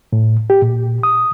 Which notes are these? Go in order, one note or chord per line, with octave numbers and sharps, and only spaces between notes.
A2
G4
A#2
D#6